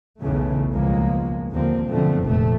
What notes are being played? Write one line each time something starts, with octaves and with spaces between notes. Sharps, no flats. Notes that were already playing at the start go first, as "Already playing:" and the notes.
B1 E2 C#3 E3 A3
C#2 G2 B2 F3 G#3 A#3
D#2 D3 F3 A#3 C4
F#2 B2 D3 F3 A3 C4
F1 A#1 F2 C3 A3